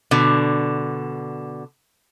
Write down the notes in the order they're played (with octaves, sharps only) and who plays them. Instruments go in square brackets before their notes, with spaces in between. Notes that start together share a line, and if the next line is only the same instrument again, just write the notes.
[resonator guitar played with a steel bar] B2 D3